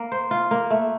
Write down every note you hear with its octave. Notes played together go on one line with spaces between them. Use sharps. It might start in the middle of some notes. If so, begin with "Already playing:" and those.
Already playing: A#3
C5
F4
A#3
A3